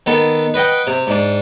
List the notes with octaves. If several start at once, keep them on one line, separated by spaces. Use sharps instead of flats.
D#3 B3 A4
B4 D#5 F#5 G5
C3
G#2 D4